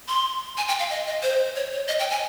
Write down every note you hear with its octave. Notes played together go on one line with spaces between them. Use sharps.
C6
G#5
G5
F5
D#5
D#5
C5
C#5
C#5
D#5
G5
G#5